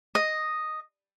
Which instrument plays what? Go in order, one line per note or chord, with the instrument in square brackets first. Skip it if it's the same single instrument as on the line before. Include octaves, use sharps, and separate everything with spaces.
[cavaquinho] D#5